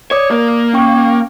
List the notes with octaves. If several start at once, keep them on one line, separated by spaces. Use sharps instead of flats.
C#5 D5 D6 D#6
A#3
C#4 G5 C#6